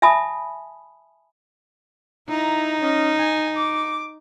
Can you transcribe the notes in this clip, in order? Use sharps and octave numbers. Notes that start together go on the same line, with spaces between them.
E5 G#5 A5 B5 D#6
D#4 E4 A#5
C#4 D#5
G#5
D6